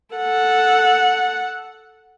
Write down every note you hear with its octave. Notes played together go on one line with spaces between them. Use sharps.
A4 F#5